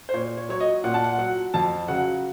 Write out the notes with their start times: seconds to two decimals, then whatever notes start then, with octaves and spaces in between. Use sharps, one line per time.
0.09 C5
0.14 A#2 C#5
0.37 C#5
0.49 F#3 C#5
0.60 D#5
0.84 A#2 F#5
0.94 A5
1.04 F#5
1.18 F#3 F#5
1.54 F2 A5
1.88 C#3 F#3 F#5